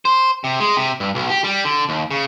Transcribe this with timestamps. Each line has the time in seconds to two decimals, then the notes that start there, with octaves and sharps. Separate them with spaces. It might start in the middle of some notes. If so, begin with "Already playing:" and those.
0.05 C5
0.44 C3
0.60 G#3
0.76 C3
1.00 G2
1.15 B1
1.30 G4
1.44 G3
1.65 D3
1.89 D#2
2.11 C#3